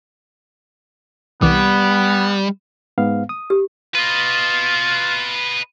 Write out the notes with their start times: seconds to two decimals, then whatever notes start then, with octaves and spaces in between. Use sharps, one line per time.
1.42 C2 E3 G3 B3 D6
2.98 G#2 B3 F5
3.29 D#6
3.50 G4
3.95 F4 B4 D#5